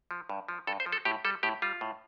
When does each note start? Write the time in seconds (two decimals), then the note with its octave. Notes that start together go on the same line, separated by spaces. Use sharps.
0.11 F3
0.29 G2
0.48 F3
0.67 G2 A4
0.80 C5
0.86 F3
0.92 A4
1.05 A2 G4
1.25 G3 A4
1.43 A2 G4
1.62 G3 F4
1.81 A2